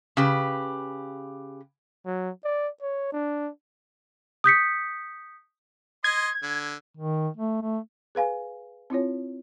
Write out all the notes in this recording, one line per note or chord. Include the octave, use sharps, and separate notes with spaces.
C#3 G4 B4
F#3
D5
C#5
D4
D#6 G6 B6 C#7
D#5 C6 G#6
D3
D#3
A3
A3
G#4 B4 F5 G#5
C4 E4 F4 C#5